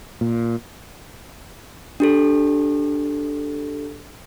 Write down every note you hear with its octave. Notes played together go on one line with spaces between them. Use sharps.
A#2
D4 G4 A4